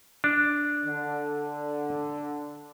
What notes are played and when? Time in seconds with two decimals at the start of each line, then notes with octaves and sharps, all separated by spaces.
0.24 D4
0.84 D3